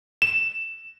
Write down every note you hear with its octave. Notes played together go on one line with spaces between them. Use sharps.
E7